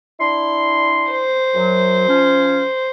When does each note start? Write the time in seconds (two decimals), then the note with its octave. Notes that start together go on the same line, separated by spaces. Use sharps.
0.20 D4 E4 C6
1.11 C5
1.55 F#2 F#3
2.08 F3 C#4